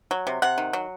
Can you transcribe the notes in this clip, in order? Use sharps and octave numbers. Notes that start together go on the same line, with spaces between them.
F#3
C3
C3 F#5
D#3
F#3